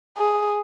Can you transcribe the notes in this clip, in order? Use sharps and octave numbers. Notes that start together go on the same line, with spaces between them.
G#4